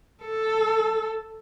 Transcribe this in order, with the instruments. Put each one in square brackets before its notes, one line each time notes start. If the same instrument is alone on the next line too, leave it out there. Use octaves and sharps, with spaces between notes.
[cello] A4